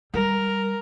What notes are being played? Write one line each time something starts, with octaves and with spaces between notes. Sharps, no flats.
G3 A#4